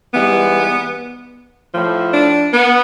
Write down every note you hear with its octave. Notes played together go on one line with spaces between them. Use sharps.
G#2 E3 G3 B3
A2 F3
D4
B3